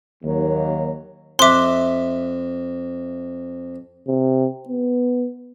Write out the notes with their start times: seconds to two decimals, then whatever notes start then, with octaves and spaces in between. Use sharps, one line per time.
0.23 D#2 F#3
1.39 F2 E5 C6 D6 F#6
4.07 C3
4.69 B3